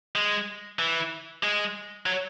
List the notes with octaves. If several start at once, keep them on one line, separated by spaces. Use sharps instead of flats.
G#3
E3
G#3
F#3